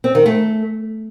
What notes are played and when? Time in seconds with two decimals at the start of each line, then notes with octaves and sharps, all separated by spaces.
0.04 C4
0.15 D#3
0.26 A3